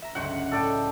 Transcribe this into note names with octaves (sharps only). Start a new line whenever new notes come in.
E5 A#5
G1 C#2 F#3 C5 F#5
A2 A4 D5 G5